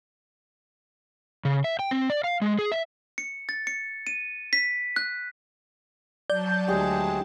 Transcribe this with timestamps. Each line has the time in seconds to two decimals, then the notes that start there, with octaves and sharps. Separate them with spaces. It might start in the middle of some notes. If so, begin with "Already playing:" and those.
1.45 C#3
1.64 E5
1.79 G5
1.91 C4
2.10 D5
2.24 F5
2.42 G#3
2.59 G#4
2.72 E5
3.18 C#7
3.49 A6
3.67 C#7
4.07 D#7
4.53 B6
4.96 F#6
6.30 F#3 D5 A5 G6
6.68 D2 G#3 G4 G#4